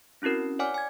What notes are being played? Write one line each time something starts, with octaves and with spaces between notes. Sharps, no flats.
C4 C#4 E4 F#4 A#4
C#5 D5 F#5 G#5 D6 F6
G#5 G#6